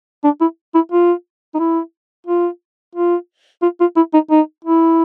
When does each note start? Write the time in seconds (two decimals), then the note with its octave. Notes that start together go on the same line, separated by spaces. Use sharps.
0.24 D4
0.41 E4
0.75 E4
0.92 F4
1.54 D#4
1.59 E4
2.27 F4
2.95 F4
3.62 F4
3.80 F4
3.97 E4
4.13 D#4
4.31 D#4
4.65 E4